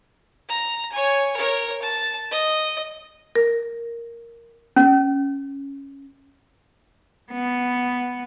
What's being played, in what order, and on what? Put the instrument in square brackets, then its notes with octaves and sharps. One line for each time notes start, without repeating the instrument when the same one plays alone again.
[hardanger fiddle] A#5
C#5 G#5
A#4 C#5
A5
D#5
[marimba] A#4
[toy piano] C#4
[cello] B3